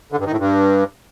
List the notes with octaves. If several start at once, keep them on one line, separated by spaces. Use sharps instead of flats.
D3
G2
D#3
A2
G2